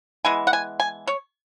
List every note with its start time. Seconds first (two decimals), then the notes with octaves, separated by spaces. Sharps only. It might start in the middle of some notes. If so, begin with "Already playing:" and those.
0.25 E3 G#3 B3 G#5
0.47 F#5
0.53 G#5
0.80 G#5
1.07 C#5